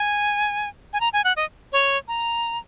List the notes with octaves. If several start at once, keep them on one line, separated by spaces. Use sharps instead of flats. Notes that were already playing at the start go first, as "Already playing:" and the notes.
Already playing: G#5
G#5
A#5
G#5
F#5
D#5
C#5
A#5